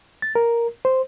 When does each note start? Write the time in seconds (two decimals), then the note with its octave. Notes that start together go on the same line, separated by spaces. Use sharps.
0.22 A6
0.35 A#4
0.85 C5